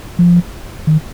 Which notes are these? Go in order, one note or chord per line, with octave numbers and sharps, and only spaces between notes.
F3
D#3